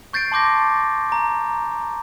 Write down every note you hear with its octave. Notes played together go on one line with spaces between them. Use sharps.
C#6 G6 A6 C7 D7
A5 C6 D6 G6 A#6
A#5